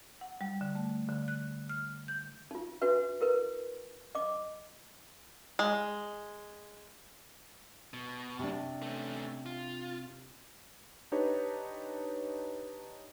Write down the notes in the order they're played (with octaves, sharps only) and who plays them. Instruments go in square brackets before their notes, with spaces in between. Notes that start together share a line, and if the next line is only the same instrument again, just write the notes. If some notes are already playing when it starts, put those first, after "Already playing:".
[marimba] F#5
G3
D3
A3
D3
F#6
F6
G6
[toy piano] D#4 F4
D4 F#4 B4 E5
E4 A#4 B4
D#5 D6
[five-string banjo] G#3
[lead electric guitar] B2
[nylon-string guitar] C3 D4
[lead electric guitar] A3 C#4
F4
[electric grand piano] D4 D#4 G4 B4 C#5